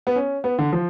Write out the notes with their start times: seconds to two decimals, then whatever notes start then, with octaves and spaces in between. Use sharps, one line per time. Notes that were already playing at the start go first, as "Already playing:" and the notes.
0.07 B3
0.16 C#4
0.44 B3
0.59 D3
0.73 F3